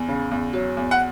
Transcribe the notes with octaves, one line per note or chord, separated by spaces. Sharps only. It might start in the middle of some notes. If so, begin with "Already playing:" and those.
Already playing: E2
C#3
E2
F#3
E2
F#5